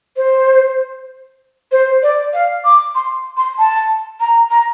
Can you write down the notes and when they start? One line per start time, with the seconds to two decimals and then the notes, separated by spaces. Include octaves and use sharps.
0.16 C5
1.71 C5
2.02 D5
2.33 F5
2.64 D6
2.95 C6
3.37 C6
3.58 A5
4.20 A#5
4.50 A#5